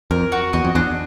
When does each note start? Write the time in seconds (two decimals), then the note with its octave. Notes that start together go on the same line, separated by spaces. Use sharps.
0.11 F2 A#4
0.32 F#4
0.53 E2 D#5
0.64 F2
0.75 E2 D4